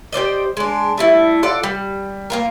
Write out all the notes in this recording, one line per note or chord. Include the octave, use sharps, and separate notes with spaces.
G4 C5 D5 D#5
G#3 D4
G3 A3 E4
F4 A4 D5 F#5
G3
A#3 F4 A#4